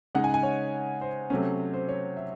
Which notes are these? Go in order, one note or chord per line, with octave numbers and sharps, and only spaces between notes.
C#3 G#3 D#4 F#5
G#5
G#5
C#5
C5
C3 F#3 A3 C#4
C5
C#5
E5